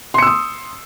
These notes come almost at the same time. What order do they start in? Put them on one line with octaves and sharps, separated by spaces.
C6 C#7 E6 D#6